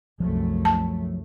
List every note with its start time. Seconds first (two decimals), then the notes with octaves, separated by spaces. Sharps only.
0.20 C2 F#2 F3 F#3 A3
0.65 A5